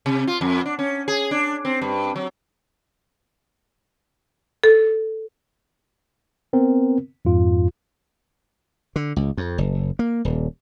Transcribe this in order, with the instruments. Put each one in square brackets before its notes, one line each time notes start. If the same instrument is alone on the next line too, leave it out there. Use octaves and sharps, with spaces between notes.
[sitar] C3
F4
F2
D4
C#4
G#4
D4
C4
G2
F#3
[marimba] A4
[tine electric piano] B3 C4 A#4
F2 G#2 F4
[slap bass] D3
C#2
F2
F#1
A#3
D#1